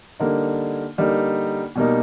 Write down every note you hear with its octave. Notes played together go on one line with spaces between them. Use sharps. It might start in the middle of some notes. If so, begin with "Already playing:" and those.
D3 G3 A#3 D#4
D3 G3 A#3 D#4
B2 G3 A#3 D#4